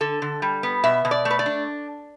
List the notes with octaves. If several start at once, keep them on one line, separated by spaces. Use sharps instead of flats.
D3 A4
D3
G3
B3
B2 E5
B2
D5
A3
B4
D5
D4